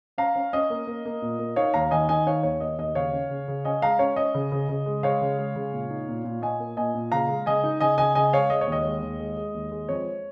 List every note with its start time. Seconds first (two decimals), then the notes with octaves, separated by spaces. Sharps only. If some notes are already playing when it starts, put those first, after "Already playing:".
0.18 C#4 F5 A#5
0.36 C#4
0.53 C#4 D#5
0.70 A#3
0.87 A#3
1.05 A#3
1.22 A#2
1.39 A#3
1.56 D#4 C#5 F5
1.74 D#2 F5 A#5
1.91 D#3 D#5 G#5
2.09 D#3 D#5 G#5
2.27 D#4 C#5 F5
2.43 D#2 C#5
2.60 A#3 D#5
2.78 D#2 D#5
2.95 C#3 C#5 F5
3.13 C#4
3.30 C#3
3.48 C#3
3.65 C#4 D#5 G#5
3.82 G#3 F5 A#5
3.99 C#4 C#5
4.16 C#4 D#5
4.35 C#3
4.52 C#3
4.69 C#3
4.86 G#3
5.03 G#3 C#5 F5
5.21 C#3
5.39 G#3
5.56 C#3
5.72 A#2
5.90 D#4
6.08 A#2
6.24 A#2
6.42 A#2 D#5 G#5
6.60 A#3
6.77 A#2 D#5 G#5
6.95 A#2
7.12 C#3 F5 A#5
7.29 G#3
7.46 C#3 D#5 G#5
7.64 D#4
7.80 C#3 D#5 G#5
7.98 C#3 D#5 G#5
8.15 C#3 D#5 G#5
8.33 G#3 C#5 F5
8.50 G#3 D#5
8.61 C#5
8.67 D#2 D#5
8.85 G#3
9.02 D#2
9.20 G#3
9.37 G#3
9.54 D#2
9.72 G#3
9.89 F2 C#5